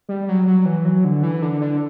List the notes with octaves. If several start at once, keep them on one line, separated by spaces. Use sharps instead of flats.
G3
F#3
F#3
E3
F#3
D3
E3
D3
D3